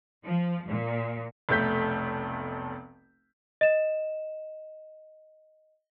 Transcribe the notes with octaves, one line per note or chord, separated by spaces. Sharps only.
F3
A#2
F1 B1 A3 G6 B6
D#5 E7